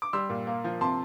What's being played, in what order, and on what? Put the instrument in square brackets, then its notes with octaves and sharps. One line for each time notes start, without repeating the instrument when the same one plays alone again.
[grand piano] D6
G3 C6 E6
A#2
A#3
F3
C3 A5 C6